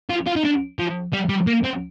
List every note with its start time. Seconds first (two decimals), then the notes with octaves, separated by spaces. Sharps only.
0.10 F4
0.26 F4
0.36 D#4
0.44 D4
0.79 F3
1.13 G3
1.29 G3
1.47 A#3
1.64 C4